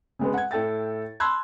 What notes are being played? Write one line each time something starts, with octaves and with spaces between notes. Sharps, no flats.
C#3 G#3 B3
F#5 G#6
A2 A4 G5 A6
A5 B5 C6 E6 F#6 G#6